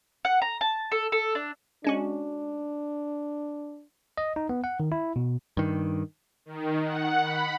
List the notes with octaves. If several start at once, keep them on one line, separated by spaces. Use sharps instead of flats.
F#5
A#5
A5
A4
A4
D4
G#3 C#4 D4 F#4
D#5
D#4
B3
F#5
D#3
E4
B2
G2 D#3
D#3
F#5
B5